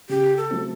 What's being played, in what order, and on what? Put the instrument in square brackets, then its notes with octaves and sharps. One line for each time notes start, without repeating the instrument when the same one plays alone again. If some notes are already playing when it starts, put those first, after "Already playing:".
[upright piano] C#3 [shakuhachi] G4
[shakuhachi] A4
[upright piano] F#3 A3 C4